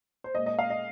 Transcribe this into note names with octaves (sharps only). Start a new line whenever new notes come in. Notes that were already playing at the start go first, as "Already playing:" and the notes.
C5
A#2 G#3 D#5
D#5
F5
D#5